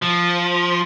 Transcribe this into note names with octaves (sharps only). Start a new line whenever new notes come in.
F3